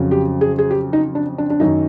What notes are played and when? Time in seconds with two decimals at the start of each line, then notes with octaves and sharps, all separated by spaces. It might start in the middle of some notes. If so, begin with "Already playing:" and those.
Already playing: F2 C#3 F#3
0.11 G4
0.41 G#4
0.58 G#4
0.71 G4
0.93 D#4
1.15 D4
1.38 D4
1.50 D4
1.60 F#2 D#3 F#3 D#4